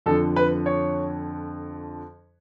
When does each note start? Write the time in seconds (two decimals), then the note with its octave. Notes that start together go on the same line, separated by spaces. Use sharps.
0.06 F2 D3 F3 A4
0.36 B4
0.66 C#5